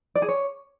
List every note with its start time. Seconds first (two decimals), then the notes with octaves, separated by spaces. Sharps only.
0.15 D5
0.22 G#4
0.29 C#5